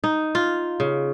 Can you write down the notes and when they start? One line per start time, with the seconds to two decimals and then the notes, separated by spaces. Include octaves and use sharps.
0.04 D#4
0.35 F4
0.80 C#3